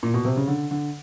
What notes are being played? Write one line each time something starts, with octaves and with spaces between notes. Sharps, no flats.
A#2
B2
C3
C#3
D3
D3